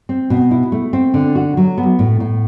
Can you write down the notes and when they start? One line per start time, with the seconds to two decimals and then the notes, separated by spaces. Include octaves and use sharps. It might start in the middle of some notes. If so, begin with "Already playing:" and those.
0.09 C4
0.30 B2
0.51 E4
0.72 A3
0.93 C4
1.14 D3
1.35 F#4
1.57 F#3
1.78 B3
1.99 A2
2.20 A2